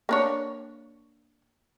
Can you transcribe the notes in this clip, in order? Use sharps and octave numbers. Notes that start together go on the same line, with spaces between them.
A#3 D4 C#5